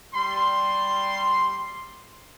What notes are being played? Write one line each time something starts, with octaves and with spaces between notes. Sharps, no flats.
G3 C6